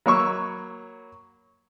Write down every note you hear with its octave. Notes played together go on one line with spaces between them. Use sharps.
F#3 A#3 C#5 B5 C#6 E6